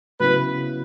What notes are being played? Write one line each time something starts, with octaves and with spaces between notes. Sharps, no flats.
C#3 F#3 B3 E4 B4